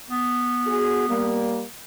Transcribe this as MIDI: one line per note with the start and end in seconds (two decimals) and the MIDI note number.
0.10 1.56 59
0.66 1.06 66
0.66 1.06 68
1.08 1.63 55
1.08 1.63 58